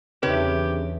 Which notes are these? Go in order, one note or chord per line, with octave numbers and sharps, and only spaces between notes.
E2 C#3 C4 D4 D#4 G4 B4 C#5